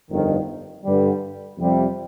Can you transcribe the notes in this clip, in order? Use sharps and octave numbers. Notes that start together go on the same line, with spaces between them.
G1 F2 D#3
G2 D3 G3
F2 C3 G3